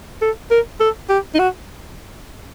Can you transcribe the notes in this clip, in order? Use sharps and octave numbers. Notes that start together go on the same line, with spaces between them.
A4
A#4
A4
G4
D#4
F#4